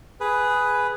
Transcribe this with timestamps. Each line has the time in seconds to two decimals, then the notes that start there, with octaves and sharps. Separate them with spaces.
0.20 G#4 B4